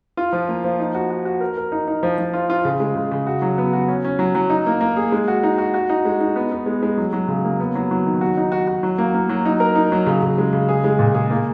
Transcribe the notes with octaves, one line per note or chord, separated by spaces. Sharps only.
F4
F3
A#3
F3
D#4
F#4
F#4
F#4
A#4
A#4
D#4
D#4
F3
F3
F4
F4
C#3
G#3
C#3
C#3
F#4
F#3
B3
F#4
C#4
C#4
F#3
F#3
D#4
A#3
A#3
G#4
G#3
F#4
D#4
F#4
F#4
D#4
G#3
D#4
B3
B3
G#3
G#3
F#3
F#3
C#3
A#3
B3
F#3
F#3
D#3
F#4
D#4
F#4
F#4
F#3
A#3
A#3
F#3
D#4
A#4
D#4
F#3
C#3
C#3
G#3
C#3
G#4
G#3
A#2
G#4
A#3